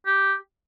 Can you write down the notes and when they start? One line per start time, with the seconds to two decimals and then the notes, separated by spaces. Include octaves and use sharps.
0.06 G4